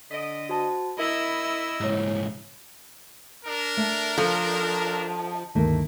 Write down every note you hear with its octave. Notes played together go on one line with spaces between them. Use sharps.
D3 D#5 B6 D7
F#4 C5 A5
E4 A#4 D#5 E6
C2 G#2 E4 C#5
D4 A#4
A3
F3 A4 G#5
D2 G2 D#3 A3 A#3